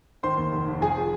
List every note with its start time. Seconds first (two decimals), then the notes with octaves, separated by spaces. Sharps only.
0.23 D#3 C5 C6
0.38 D#2
0.52 F1
0.68 F1
0.81 F3 G#4 G#5